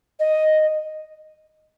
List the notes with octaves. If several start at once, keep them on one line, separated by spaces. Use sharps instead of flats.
D#5